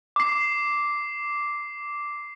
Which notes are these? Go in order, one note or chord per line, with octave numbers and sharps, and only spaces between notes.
D6 C7